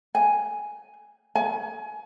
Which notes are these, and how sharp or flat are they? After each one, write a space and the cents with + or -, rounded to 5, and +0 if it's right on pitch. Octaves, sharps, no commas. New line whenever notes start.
G#5 +0
G#5 +25